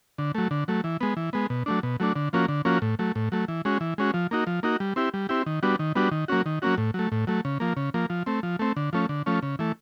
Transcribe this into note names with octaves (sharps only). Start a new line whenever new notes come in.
D3
F#3 A3
D3
F#3 A3
E3
G#3 B3
E3
G#3 B3
B2
F#3 A3 D4
B2
F#3 A3 D4
D3
F3 A#3 C#4 F#4
D3
F3 A#3 C#4 F#4
A2
F#3 A3
A2
F#3 A3
E3
G#3 C#4 F#4
E3
G#3 C#4 F#4
F3
A#3 D#4 F#4
F3
A#3 D#4 F#4
G3
C4 E4 G4
G3
C4 E4 G4
D#3
G3 B3 D4 F#4
D#3
G3 B3 D4 F#4
D#3
F#3 A#3 C#4 F#4
D#3
F#3 A#3 C#4 F#4
A2
F#3 A3
A2
F#3 A3
C#3
F3 A#3
C#3
F3 A#3
F3
A3 C4
F3
A3 C4
D3
F3 A3 C#4
D3
F3 A3 C#4
C#3
E3 A3